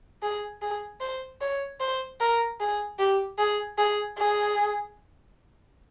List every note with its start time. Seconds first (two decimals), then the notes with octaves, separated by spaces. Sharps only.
0.23 G#4
0.62 G#4
1.01 C5
1.41 C#5
1.80 C5
2.20 A#4
2.60 G#4
2.99 G4
3.39 G#4
3.78 G#4
4.18 G#4